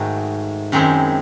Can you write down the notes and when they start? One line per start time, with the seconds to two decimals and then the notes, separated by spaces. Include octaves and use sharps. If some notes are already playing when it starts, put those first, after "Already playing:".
Already playing: G#2 D#3 A3 D#4 F#4
0.72 F#2 D#3 G#3 C4 E4